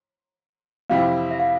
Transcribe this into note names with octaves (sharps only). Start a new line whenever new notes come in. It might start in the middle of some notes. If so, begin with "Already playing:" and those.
F2 C3 G3 C4 E4 F5
E5
F5